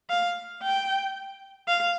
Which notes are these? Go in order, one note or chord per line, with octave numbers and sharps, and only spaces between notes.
F5
G5
F5